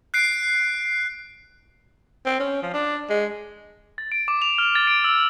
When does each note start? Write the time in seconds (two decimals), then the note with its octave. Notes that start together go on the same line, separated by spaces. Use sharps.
0.14 F#6 C7 D7
2.25 C4
2.40 C#4
2.62 F3
2.74 D4
3.10 G#3
3.98 A6
4.12 D7
4.28 D6
4.42 F7
4.58 F6
4.75 A6
4.87 D7
5.04 E6